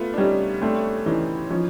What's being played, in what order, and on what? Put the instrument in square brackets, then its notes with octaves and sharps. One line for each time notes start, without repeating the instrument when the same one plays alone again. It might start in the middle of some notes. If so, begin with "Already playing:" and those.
Already playing: [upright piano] A3 B3 [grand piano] F4
[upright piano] D4
[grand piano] G3 [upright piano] C#4 D#4
[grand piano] A3 [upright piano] C4 D4
[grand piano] E3 [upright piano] C#4 D#4
[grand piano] F3 [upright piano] C#4 D#4